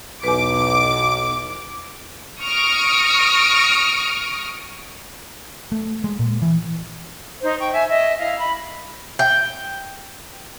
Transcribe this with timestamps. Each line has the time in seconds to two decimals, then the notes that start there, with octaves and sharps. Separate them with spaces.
0.24 B1 E2 B4 D6
2.41 C#6 D#6 F6 A#6 D7
5.72 A3
6.04 G#3
6.19 A#2
6.42 E3
7.42 D#4 C5
7.59 G5 C#6
7.74 E5 G#5
7.88 D#5 E5
8.19 E4 D#5 F5
8.39 B5
9.19 G5